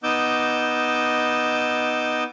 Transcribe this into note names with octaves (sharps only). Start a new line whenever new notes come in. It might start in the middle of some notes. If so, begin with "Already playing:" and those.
B3 D#4 D#5 D6 E6 G6